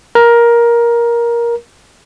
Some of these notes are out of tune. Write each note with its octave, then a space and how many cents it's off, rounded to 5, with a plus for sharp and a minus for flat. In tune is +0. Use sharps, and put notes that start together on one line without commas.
A#4 +15